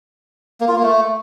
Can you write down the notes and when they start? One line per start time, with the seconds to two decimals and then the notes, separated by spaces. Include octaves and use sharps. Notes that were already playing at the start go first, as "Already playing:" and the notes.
0.61 A#3
0.68 F4
0.76 A#3
0.83 A3